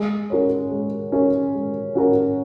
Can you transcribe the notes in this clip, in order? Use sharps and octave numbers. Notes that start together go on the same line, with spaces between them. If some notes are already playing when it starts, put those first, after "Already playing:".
Already playing: G#3
C#4 F#4 A#4 C#5
G#3
C#4 F#4 A#4 C#5
G#3
C#4 F#4 A#4 C#5